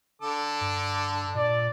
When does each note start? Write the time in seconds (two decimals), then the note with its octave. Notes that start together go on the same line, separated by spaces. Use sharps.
0.22 D3 A4 D6
0.61 G2
1.34 A#2 D5